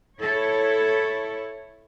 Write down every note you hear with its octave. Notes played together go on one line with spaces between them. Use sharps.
E4 A4 C#5